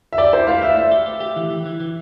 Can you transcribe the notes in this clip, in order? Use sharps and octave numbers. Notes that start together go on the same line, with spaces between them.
E5
G4 D5
E4 C5
A3 F5
E4 E5
A3 E5
G4
G4
G4
E3
E3
E3
E3